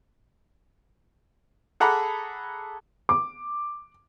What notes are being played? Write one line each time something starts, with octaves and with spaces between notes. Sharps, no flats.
G#4 A4 F#5 A#5 B5 D6
D6